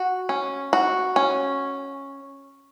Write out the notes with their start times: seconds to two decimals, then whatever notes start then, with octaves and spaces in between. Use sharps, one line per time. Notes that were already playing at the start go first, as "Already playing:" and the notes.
Already playing: F#4
0.29 C#4
0.73 F#4
1.16 C#4